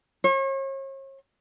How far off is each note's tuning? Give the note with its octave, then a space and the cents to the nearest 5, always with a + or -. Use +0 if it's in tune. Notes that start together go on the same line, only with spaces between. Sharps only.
C#5 -40